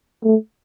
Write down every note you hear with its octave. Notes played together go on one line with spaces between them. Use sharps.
A3